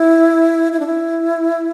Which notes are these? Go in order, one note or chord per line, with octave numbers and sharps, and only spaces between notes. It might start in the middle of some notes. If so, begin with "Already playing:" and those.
Already playing: E4
E4
D4
E4